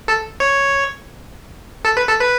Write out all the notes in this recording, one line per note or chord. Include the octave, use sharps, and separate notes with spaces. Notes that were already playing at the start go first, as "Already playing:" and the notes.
A4
C#5
A4
B4
A4
B4